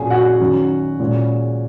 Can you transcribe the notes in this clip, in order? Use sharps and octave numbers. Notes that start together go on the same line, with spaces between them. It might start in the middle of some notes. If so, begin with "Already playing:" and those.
Already playing: A#2 F#3 C#4 G#4 G#5
F#4 F#5
F#2 D#3 F#3 C#4
A#2 G#3 C#4